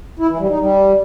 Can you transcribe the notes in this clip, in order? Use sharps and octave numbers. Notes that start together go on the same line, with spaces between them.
E4
E3
G3
D#4
G3